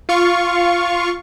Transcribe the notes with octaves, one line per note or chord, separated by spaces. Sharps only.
F4 F5 C#6